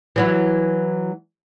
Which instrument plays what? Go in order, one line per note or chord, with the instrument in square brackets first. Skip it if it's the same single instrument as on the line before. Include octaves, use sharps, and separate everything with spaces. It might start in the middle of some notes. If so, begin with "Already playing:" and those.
[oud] E3 F#3 E4